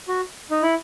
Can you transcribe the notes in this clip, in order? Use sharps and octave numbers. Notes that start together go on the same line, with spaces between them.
F#4
D#4
E4